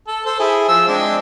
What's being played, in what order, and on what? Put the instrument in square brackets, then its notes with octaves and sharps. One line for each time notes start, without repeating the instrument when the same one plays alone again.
[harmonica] A4
A4 C5
E4 G#4
F3 E6
G#3 C4 D4